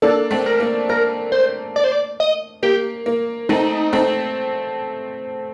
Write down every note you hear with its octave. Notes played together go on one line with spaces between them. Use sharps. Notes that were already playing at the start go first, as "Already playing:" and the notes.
A#3 D4 A4
A3 C4
A#4
A#3
A#3 A#4
C5
D5
C5
D5
D#5
A#3 G4
A#3
A3 C4 D#4
A3 C4